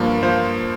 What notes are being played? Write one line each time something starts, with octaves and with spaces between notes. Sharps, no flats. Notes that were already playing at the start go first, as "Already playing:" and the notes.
Already playing: G2 F3 A#3
F3 A#3 C5